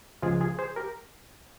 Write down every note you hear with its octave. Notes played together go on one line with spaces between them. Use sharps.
C#2 C#3 F3 G#3 F4 G#4
F4 G#4
G#4 C5
G4 A#4